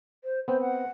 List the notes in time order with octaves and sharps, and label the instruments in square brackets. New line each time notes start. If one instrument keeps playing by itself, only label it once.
[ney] C5
[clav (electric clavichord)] B3 C4 [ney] C5
[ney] F#5